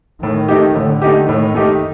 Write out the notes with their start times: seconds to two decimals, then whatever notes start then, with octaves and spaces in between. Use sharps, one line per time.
0.22 A2 D#3
0.48 A3 D#4 G4
0.75 A2 D3
1.02 A3 D#4 G4
1.28 A2 D#3
1.54 A3 D#4 G4